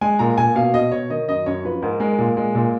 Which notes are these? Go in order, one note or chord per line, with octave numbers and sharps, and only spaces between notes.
G#3 G#5
A#2 A#5
A#2 G#5
B2 F5
B2 D#5
B2 C#5
D#3 D#5
F#2 D#5
F#2 C#5
F3 B4
G#2 A#4
G#3 A#4
A#2
G#3
A#2